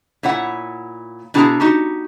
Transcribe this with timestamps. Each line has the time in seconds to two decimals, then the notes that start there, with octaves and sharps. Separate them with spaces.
0.23 A#2 E4 C#5 F#5
1.34 B2 D4 E4 G#4 A5 A#5
1.60 D#4 F#4 G4